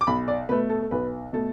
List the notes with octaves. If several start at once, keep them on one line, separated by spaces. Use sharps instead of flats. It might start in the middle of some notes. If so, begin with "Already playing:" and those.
D6
B1 B5
D5
B2 A3 B4
A4
A4
B1 B4
B2 A3 A4